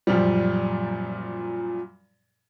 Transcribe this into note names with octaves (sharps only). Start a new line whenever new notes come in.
F#2 A#2 F3 G3